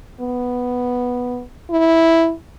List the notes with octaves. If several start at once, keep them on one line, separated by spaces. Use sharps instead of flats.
B3
E4